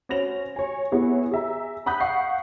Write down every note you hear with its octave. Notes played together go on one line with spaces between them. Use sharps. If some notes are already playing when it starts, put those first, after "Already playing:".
C#4 F#4 C5 A#6 F7
C#5 G#5
B3 E4 G#4 C#5
G#4 E5 A#5
F#5 B5 D#6 F#6 G6 B6
F5 F#5 C#6 F#6 C7